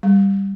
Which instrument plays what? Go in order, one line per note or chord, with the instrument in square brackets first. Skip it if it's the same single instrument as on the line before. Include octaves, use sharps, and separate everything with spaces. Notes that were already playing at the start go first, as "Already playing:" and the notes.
[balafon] G3